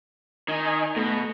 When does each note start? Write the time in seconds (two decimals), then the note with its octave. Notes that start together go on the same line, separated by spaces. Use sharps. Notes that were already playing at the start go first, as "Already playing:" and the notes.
0.48 D#3 D#5 G#5
0.96 B2 A3 A#5